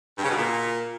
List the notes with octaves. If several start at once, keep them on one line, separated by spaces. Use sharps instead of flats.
G2
C#3
B2
A#2